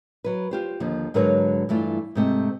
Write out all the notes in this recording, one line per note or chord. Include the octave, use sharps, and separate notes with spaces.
F#3 B4
F4 G4 C5
D#2 D3 F3
G#2 D3 F#3 A#4 B4 C#5
G2 E3 A3 F4
G#2 C3 A3